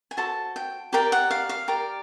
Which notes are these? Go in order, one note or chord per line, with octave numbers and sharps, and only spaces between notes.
G#5
F#4 A4 C5 A5
G5
G4 A#4 D5 G5
F#5
F5
F5
G4 A#4 D5